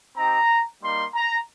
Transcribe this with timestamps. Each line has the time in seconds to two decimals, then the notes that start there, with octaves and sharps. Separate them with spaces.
0.16 C4 D#4 G4 A#5
0.81 G3 A#3 D#4 C6
1.13 A#5